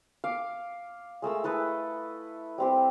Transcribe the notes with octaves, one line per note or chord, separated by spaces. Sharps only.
F5 D6
G#3 A3 A#4 E6
E4 A4 B4 D#5
G3 C4 G4